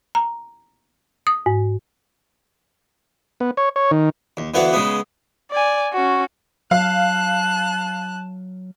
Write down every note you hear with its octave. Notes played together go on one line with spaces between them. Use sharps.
A#5
D#6
G#2
B3
C#5
C#5
D#3
D#2
D2 E3 B3 F5 F#5
C#3 G#3 B3
D5 G#5
C#4 F#4
F#3 F5 A5 F#6